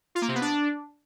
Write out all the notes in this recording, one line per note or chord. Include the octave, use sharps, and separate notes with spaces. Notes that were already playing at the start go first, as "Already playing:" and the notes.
F4
A#3
C3
B3
D4